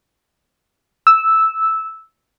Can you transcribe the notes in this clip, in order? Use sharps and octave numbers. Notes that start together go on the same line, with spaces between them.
E6